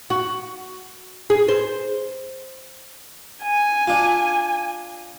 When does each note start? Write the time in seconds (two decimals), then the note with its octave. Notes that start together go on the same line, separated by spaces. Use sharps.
0.10 F#4
1.30 G#4
1.48 C5
3.42 G#5
3.87 D4 F4